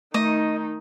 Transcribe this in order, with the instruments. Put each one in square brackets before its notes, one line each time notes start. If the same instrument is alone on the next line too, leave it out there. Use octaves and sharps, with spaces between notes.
[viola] D#3 D#4 [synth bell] A3 [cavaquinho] D#5